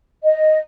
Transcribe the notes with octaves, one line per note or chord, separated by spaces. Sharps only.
D#5